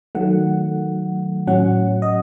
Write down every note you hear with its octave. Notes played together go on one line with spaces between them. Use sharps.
D#3 F#3 A3 F#5
A2 F#3 C#4 F#5
D#5